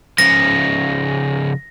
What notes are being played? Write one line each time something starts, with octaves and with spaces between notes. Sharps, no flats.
C#3 F3 A#6